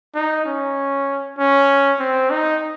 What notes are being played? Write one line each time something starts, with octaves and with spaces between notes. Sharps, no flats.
D#4
C#4
C#4
C4
D#4